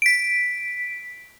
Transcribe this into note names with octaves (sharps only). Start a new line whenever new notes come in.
B6 D7